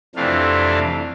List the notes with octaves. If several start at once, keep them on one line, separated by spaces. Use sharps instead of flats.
F2 C3 E3 A3 D4 F5